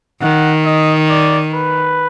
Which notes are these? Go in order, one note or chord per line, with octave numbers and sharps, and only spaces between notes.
D#3 F#5
D#5
D5
B4